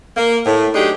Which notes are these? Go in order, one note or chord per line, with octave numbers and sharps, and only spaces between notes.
A#3
A2
F#3 A3 D4 D#4 G4 G#4